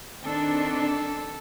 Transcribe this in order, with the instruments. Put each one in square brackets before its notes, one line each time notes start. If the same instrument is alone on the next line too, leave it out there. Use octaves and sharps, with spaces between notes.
[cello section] D#3 C4 D4 [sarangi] A4